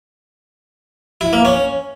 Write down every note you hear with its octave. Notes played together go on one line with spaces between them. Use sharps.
E4
A#3
C#4